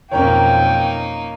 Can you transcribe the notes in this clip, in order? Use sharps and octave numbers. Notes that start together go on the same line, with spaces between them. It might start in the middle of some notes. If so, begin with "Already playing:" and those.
B1 F2 A#3 C#4 D#4 A#4 C#5 G5